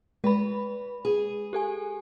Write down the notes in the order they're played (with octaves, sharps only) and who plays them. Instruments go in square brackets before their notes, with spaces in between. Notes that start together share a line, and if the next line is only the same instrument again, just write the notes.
[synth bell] G#3 B5 [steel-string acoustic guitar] B4
[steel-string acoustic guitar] G#4
[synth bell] G4 A4 G#5